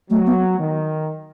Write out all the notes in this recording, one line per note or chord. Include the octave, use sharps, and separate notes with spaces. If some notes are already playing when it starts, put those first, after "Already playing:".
F#3 A3
B3
D#3